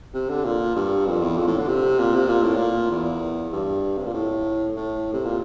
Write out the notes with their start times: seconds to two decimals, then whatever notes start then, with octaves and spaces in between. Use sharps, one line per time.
0.14 C3
0.30 D3
0.45 A#2
0.76 G2
1.06 F2
1.22 E2
1.37 F2
1.47 A2
1.58 D3
1.68 C3
1.99 A#2
2.14 C3
2.28 A#2
2.42 A2
2.56 A#2
2.91 E2
3.53 G2
3.98 C3
4.06 A#2
4.14 A2
4.76 A2
5.13 C3
5.25 A#2